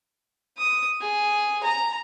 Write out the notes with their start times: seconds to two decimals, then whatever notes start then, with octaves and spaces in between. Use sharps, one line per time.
0.58 D#6
1.01 G#4
1.64 A#5